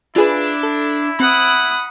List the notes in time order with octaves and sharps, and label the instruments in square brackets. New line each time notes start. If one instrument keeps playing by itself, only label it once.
[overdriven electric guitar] D4 [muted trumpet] E4 [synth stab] F4 G#4 B4
[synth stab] A4
[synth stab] C4 [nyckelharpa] F#5 D#6 [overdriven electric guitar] B5